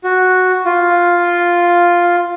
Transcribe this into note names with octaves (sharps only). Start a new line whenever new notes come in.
F#4
F4